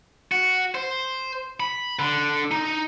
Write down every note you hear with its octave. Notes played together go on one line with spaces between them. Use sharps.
F#4
C5
B5
D3
D#4